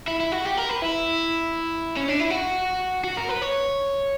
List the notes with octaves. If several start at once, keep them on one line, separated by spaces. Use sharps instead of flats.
E4
E4
F#4
G4
A#4
B4
E4
C#4
D4
E4
F#4
F#4
A#4
B4
C#5